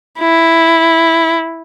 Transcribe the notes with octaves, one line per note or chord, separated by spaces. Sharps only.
E4